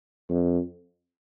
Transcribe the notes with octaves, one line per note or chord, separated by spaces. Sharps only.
F2